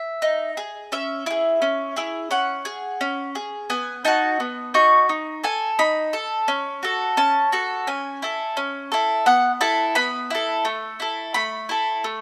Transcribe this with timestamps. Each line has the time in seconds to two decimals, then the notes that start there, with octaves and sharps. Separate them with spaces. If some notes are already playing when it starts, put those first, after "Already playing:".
Already playing: E5
0.22 D#4
0.57 G#4
0.92 C#4 E5
1.26 E4 G#4
1.62 C#4
1.96 E4 G#4
2.31 C#4 F#5
2.65 G#4
3.01 C#4
3.35 G#4
3.70 B3 G#5
4.05 D#4 F#4 A5
4.40 B3
4.74 D#4 F#4 C#6
5.09 D#4
5.44 A4 G#5
5.79 D#4 B5
6.13 A4
6.48 C#4
6.83 F#4 A4
7.17 C#4 A5
7.52 F#4 A4
7.87 C#4 G#5
8.22 E4 A4
8.57 C#4
8.92 E4 A4
9.26 B3 F#5
9.61 E4 A4 A5
9.95 B3 B5
10.30 E4 A4
10.65 A3
11.00 E4 A4
11.34 A3 B5
11.69 E4 A4
12.04 A3